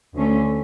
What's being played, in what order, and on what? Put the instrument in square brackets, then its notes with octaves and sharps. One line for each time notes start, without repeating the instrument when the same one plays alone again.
[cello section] D2 D3 A3 C#4